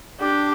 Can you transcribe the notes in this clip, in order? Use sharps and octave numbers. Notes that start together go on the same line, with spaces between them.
D4 G4